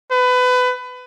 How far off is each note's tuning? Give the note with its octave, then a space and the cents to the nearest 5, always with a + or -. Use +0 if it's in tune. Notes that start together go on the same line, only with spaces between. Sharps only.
B4 +25